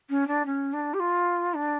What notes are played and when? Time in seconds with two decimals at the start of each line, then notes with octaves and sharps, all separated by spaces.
0.10 C#4
0.27 D4
0.46 C#4
0.73 D4
0.94 G4
1.00 F4
1.54 D4